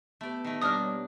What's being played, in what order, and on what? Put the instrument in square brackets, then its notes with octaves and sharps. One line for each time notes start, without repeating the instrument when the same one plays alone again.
[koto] A3 D5 [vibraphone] B3 G4 B4
[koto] D#3 A3
[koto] B2 A#3 D4 [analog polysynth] G3 C#5 D5 [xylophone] D#6 F6